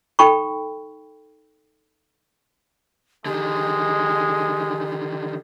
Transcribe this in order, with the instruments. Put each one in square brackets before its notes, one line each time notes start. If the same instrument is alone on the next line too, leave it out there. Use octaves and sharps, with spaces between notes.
[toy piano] D#4 A4 G5 A5 B5 C#6
[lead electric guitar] D3 D#3 [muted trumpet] G#3 [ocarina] G4